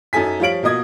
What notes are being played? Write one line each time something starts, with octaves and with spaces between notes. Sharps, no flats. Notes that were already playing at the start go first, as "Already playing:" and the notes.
F#2 D#4 A4 G#5 B6
F3 G3 C#5 F5 D7 F#7
B2 A#3 F4 D#5 D#6 G#6